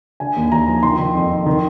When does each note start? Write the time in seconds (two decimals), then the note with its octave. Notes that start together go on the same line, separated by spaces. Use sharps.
0.20 D3 G#5
0.36 D#2
0.52 D#2 A#5
0.68 F3
0.83 D#3 C6
0.99 D#3
1.15 F2
1.30 F2
1.46 D#3